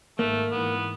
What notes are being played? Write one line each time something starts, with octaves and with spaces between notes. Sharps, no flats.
G#1 A3 A#3
G#2 E3 B3